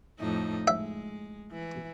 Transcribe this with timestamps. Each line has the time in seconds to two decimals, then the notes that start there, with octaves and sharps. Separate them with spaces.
0.19 F2 A2 D#4
0.68 G#3 E5
1.51 E3